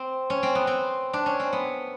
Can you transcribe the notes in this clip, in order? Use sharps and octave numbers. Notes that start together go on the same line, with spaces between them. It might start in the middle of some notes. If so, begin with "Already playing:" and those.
Already playing: C4
C#4
C4
B3
C4
D4
C#4
C4
B3